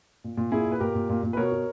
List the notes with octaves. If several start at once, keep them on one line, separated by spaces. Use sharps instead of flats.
A#2
A#2
A#2 E4 G#4
A#2
B4
A#2 G4 A#4
A#2
A#2
A#2
B4
B2 A#4 C#5
B2